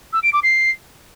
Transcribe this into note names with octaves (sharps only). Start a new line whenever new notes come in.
E6
D7
D6
C7